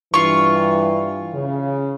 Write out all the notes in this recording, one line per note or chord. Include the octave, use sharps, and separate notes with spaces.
G2 E3 F4 C#6
C#3